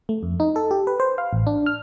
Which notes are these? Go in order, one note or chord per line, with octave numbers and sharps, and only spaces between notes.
A3
F2
D#4
A4
G4
B4
C5
F5
A1
D4
F6